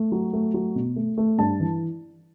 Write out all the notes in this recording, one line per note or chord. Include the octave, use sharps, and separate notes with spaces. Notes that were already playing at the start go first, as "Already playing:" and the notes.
Already playing: A3
F#3
A3
F#3
B2
A3
A3
G2 A5
E3